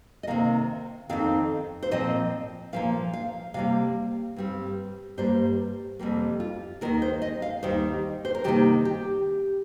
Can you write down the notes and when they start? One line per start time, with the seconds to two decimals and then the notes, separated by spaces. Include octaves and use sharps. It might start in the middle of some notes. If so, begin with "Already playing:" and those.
0.23 D#5
0.27 C3 D#3 A#3 F5
1.09 F2 D#3 C4 F5
1.83 C5
1.91 A#2 F3 C4 D#5
2.73 A#2 F3 A#3 F5
3.13 F5
3.54 C3 G3 A#3 F5
4.36 G2 G3 C4
5.17 G2 G3 A#3 C5
5.99 F2 C3 G3 A#3
6.40 F4
6.81 D#2 D#3 A#3 A#4
7.02 C5
7.22 D#5
7.42 F5
7.63 D#2 D#3 G3 C5
8.25 C5
8.35 A#4
8.44 C3 D#3 G3 A#3 G4
8.85 G4